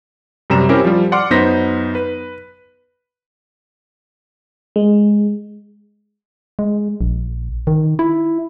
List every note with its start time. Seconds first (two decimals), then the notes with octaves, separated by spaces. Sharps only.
0.50 F#2 C3 G3 A#5 E7
0.69 C4 C#4 E4 G4 A#4 C5
0.84 F3 G3
1.12 D5 F#5 C6 D6 F6
1.31 F#2 B3 D#4 C5 A#6 B6
1.95 B4
4.76 G#3
6.59 G#3
7.01 A#1
7.67 D#3
7.99 E4